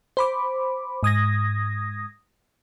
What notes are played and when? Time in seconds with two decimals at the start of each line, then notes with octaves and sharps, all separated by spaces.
0.17 C5 B5 D6
1.03 G#2 D#6 G#6 A#6